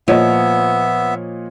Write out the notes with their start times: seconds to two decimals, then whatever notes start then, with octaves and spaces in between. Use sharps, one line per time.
0.08 A#2 F3 B3 C#5 D#5 E5